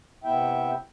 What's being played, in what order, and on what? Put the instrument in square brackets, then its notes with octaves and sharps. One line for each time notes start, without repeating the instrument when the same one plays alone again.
[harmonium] C3 B3 E4 E5 G5